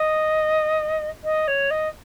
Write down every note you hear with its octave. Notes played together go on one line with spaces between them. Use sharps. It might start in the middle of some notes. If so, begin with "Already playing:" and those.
Already playing: D#5
D#5
C#5
D#5